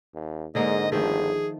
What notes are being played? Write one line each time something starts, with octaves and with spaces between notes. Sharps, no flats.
D#2
G#2 D3 G#3 A#3 D#5
G1 D#3 F3 A3 G#4